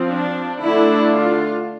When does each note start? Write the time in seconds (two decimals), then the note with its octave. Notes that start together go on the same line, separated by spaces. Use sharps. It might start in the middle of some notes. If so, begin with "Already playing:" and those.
Already playing: F3 C4
0.10 D4
0.61 D3 A3 D4 E4
1.12 F4